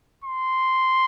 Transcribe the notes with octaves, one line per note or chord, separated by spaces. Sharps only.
C6